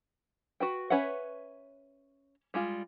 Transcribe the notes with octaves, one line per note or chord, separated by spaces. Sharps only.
F#4 B4 G5
C#4 B4 C#5 E5 F#5
G3 G#3 F4